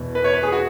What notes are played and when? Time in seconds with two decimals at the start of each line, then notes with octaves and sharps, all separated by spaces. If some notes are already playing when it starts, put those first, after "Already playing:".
Already playing: E2 B2
0.15 B4
0.24 C#5
0.34 B4
0.43 G#4
0.52 F#4